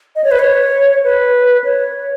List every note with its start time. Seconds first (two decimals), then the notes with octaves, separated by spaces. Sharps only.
0.16 D#5
0.24 C#5
0.31 B4
0.39 C#5
1.04 B4
1.64 C#5